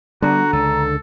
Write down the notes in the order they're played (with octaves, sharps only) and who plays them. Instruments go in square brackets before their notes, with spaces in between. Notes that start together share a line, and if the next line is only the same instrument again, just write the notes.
[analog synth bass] D3 [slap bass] G3 B3 [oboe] F#4 [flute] A#5
[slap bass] C#2 [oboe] A4